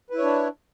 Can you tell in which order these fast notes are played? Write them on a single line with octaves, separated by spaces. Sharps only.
B4 E4 C#5 D4